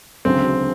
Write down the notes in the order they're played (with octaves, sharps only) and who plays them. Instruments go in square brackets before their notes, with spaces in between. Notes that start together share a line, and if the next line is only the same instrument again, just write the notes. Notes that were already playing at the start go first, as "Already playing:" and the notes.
[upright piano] E1 D2 C#3 F#3 [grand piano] C4